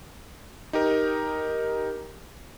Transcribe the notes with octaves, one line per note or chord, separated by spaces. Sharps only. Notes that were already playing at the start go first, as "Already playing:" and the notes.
D#4 G4 A#4